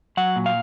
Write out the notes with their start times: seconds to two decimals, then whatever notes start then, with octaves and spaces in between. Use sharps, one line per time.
0.17 F#3 F#5
0.36 A#2
0.46 F5